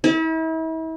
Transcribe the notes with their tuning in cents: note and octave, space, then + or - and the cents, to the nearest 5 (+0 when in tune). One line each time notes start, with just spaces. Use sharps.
E4 -40